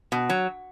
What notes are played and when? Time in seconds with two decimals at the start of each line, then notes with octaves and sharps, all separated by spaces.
0.12 B2
0.30 F#3